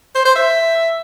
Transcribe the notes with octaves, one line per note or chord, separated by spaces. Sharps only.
C5
C5
E5